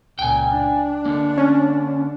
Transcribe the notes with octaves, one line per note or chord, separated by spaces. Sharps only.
C#2 A#2 G5 G#5
D4
D3 A#3
C#4